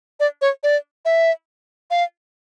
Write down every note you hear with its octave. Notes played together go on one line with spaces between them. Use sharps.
D5
C#5
D5
E5
F5